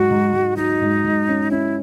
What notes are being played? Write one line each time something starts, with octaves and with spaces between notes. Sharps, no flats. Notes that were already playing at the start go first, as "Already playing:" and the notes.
Already playing: G#2 F#3 F#4
G#2
G#2
F#3 D#4
G#2
G#2
C#4
C#4 E4